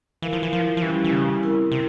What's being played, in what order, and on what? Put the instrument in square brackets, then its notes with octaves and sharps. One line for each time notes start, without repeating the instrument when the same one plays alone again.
[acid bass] E3 [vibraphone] E4 A#4 F5
[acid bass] F3
E3
F3
F3
[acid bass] E3 [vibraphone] G3 C#4 E4 G4
[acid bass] E3
C#3
[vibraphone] C4 E4 A#4
[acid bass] C3